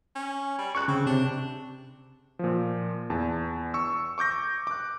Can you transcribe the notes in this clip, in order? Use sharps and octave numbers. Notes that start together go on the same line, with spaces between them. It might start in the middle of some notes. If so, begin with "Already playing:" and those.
C#4
G3
C#2 C#6 F#6
C#3 C4
C3 D4
A#2 F3
E2 A5
C#6 E6
C#6 D6 G6 A#6
D6 F#6